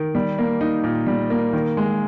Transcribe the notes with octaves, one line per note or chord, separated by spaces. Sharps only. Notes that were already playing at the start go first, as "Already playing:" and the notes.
Already playing: D#3
G3
A#3
D#4
A#2
G3
A#3
D#3
G#3